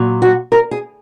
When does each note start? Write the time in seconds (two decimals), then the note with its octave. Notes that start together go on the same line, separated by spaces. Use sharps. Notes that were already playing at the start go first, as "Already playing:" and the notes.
Already playing: A#2 F#3
0.22 F#4
0.52 A#4
0.71 G#4